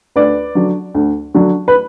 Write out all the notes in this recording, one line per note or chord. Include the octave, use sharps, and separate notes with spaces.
D2 B4 D5
D3 F#3
D2
D3 F#3
B4